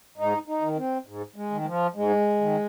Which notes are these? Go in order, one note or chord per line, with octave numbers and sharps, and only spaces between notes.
G#2 D#4
D#4
D#3
C4
G#2
G#3
D#3
G#3
F3
G#2 G#3
D#3